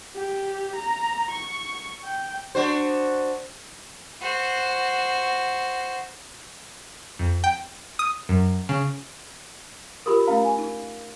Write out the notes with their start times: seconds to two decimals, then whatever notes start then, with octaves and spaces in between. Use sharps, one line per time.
0.16 G4
0.76 A#5
1.31 C#6
2.04 G5
2.55 D4 F#4 C5
4.21 F#4 C5
7.19 F2
7.44 G5
7.99 D#6
8.29 F#2
8.69 C#3
10.06 F4 G4 A#4 B5 D#6
10.27 A3 C#4 F5 A#5
10.44 G#5
10.59 D#4